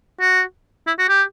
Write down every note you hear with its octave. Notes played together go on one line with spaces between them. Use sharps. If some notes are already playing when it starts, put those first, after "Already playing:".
F#4
E4
F#4
G4